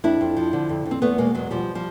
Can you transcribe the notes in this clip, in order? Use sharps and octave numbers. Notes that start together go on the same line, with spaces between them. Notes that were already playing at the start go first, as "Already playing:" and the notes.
F2 D4 E4
F2
F3
D3
F2
F2
C4
E2 A3 B3
B2 G#3 A#3
E2 F#3 G#3
B2 F3 G3
F3 G3